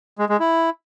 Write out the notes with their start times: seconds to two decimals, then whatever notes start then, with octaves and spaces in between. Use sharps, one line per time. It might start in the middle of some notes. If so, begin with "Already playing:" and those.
0.18 G#3
0.29 G#3
0.39 E4